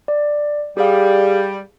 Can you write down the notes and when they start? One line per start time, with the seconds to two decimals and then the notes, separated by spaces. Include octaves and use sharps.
0.08 D5
0.77 G3 G4 G#4 F5